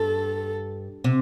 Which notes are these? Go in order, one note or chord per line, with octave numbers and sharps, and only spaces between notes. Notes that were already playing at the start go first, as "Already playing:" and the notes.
Already playing: G2 A4
C3